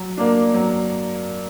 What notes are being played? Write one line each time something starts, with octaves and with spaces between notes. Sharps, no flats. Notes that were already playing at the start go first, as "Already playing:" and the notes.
Already playing: F#3
A#3 D4
F#3